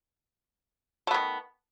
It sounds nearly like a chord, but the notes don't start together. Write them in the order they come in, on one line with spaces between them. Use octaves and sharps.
A3 B3 D#3